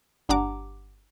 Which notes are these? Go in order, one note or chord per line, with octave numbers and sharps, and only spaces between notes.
G1 D4 G4 F#5 A#5 D6